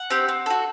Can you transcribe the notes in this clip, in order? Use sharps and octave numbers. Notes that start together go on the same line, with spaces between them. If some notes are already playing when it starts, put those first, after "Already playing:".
Already playing: F#5
C4 G4
C4
F#4 A4